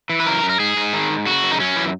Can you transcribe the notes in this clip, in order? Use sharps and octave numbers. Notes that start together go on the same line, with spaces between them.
E3
B4
F#2 A#4
F#2
A#4
G#2 G#4
G#2
D#3
G#2
C#3 F#4
F#2
D#4
F#2 C#4
E3